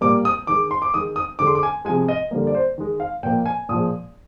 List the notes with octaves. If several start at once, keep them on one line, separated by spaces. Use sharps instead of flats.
A#2 G3 A#3 D6
D#6
D#3 G#3 D6
C6
D6
D#3 G#3 D#6
D#6
D3 G#3 D6
C6
D6
G#5
C3 F3 G#3 G#5
D#5
D3 G3 A#3
D5
C5
D#3 G#3
F5
A#2 F3 A#3 G5
G#5
A#2 F3 G#3 D#6